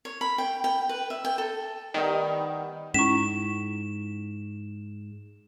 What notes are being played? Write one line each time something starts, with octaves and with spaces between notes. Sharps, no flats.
C#5
B5
G5
G5
B4
E5
G5
A4
D#3 G3 B3 D#4
G#2 C#4 E4 C#6 B6 E7